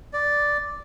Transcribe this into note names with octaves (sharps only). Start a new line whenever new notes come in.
D5